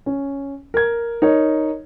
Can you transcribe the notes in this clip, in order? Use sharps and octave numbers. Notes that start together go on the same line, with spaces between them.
C#4
A#4 G#6
D#4 A#4 C#5